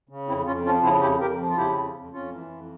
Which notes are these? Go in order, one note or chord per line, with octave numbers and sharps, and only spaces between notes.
C#3
F2 C4 E4
F2 C#4 F4
F3 C#4 F4
C#3 C4 E4
F2 E4 G4
F2 G4 A#4
F3
F4
C#3 E4 G4
F2
F2
F2 C#4 F4
E3
F2